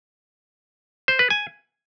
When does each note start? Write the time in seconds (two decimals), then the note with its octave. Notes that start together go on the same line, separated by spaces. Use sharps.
1.08 C5
1.19 B4
1.30 G#5